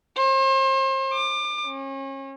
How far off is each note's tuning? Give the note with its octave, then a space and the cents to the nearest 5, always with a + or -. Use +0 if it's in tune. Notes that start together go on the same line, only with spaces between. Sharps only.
C5 +35
D6 +30
C#4 -35